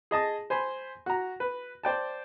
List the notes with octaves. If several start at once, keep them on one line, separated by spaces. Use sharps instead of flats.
G#4 D#5 A5 D#6
C5 G#5 B5 C6
F#4 A#5
B4
C5 D5 G5 A5